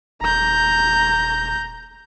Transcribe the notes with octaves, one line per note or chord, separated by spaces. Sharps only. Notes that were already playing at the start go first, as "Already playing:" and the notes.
D#1 A#5 G6